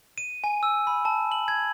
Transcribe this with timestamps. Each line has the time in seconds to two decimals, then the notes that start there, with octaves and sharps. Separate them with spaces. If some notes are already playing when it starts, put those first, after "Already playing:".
0.18 D#7
0.44 G#5
0.63 E6
0.87 B5
1.05 A5
1.32 F#7
1.48 G#6